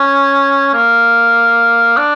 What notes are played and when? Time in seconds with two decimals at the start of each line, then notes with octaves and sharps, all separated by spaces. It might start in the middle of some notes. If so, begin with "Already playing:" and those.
Already playing: C#4
0.74 A#3
1.97 D4